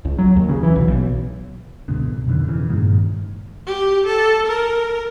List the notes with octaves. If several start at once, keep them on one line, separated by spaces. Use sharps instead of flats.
C#2
F#3
D#2
C#3
E3
B1
B1
C#2 G#2 B2 D3
F2 B2 D3 D#3
C#3 E3
G2 A#2 D#3 G#3
G4
A4
A#4